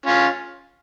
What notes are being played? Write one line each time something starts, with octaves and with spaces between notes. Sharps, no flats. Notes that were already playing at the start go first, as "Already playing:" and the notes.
C#4 F4